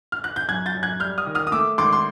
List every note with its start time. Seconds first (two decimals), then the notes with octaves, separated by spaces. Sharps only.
0.12 F6
0.24 F#6
0.36 G6
0.48 F#2 F#6 G#6
0.66 G6 A6
0.75 F#2
0.83 F#6 G#6
1.00 G3 F6 G6
1.18 D#6 F6
1.26 D#3
1.35 D#6 F6
1.47 D#6
1.52 A3 D6 E6
1.78 G#1 C6 D6
1.93 C6